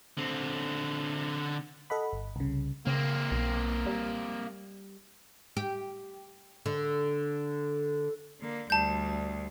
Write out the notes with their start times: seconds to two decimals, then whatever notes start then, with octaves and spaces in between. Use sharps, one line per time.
0.17 D3 C4
1.90 A4 D#5 F#5 B5
2.12 G1
2.36 C2 C#3
2.87 C#3 A#3 C4
3.31 B1
3.86 G3
5.57 G4
6.66 D3
8.41 D3 A#3
8.70 D2 G3 A5 G6